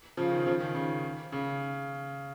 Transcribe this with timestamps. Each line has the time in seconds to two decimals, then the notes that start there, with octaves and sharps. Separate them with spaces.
0.17 C#3 F3
0.32 D#3
0.46 C#3 F3
0.60 D#3
0.75 C#3
1.32 C#3